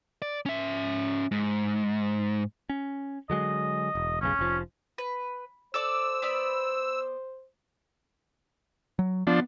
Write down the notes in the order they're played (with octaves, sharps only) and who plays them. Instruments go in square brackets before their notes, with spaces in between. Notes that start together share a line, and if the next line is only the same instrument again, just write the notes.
[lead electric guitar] D5
C#4 E5
G#2
[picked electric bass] C#4
[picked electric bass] D3 F#3 G#3 [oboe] D#5
[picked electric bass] E1
[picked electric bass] F#1 B1 C#3 [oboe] C#4
[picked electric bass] F1 F3
[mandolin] B4
[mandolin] A4 D5 D6 [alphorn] C5 [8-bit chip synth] E6
[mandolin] B3 D5 B5
[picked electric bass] F#3
[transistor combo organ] F3 D4 [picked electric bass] B3